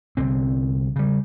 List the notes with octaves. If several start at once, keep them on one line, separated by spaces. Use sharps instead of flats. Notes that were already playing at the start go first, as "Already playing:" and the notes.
C2 D3 C4
C#3 G3